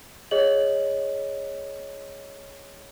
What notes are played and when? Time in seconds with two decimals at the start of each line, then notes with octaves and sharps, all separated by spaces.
0.31 G#4 C#5 D#5 F#7